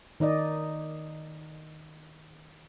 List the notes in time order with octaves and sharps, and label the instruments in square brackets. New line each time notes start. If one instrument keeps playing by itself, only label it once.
[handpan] D#3 D#4 D5 D#5